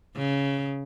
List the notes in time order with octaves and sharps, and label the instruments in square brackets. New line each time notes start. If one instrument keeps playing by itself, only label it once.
[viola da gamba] C#3